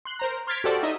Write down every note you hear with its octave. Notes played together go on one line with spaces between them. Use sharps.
C6 F#6
A#4 C5 A#5
C6 F6 G#6 A6 B6 D7
F#4 G4 A4 C5 D5
D#4 D#5 E5